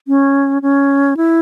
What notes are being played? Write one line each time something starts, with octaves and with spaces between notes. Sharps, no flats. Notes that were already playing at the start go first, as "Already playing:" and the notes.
C#4
C#4
E4